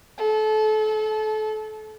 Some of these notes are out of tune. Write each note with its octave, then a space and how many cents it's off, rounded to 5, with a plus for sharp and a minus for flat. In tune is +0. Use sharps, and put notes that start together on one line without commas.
A4 -30